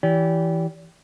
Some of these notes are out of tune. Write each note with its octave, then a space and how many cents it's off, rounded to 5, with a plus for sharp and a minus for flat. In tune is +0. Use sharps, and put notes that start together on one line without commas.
E3 +0 G4 -10 D5 -35